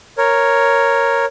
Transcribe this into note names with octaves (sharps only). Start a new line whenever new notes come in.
A#4 C#5